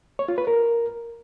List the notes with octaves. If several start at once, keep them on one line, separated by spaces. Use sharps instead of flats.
C#5
F4
B4
A#4